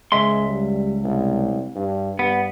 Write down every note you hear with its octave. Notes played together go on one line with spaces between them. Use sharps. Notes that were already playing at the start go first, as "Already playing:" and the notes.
C#2 G#3 E5 C6
G3
C2
G2
G2 B3